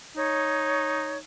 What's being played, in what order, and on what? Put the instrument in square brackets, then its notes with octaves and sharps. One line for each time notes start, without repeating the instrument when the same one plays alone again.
[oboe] D#4 [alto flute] C#5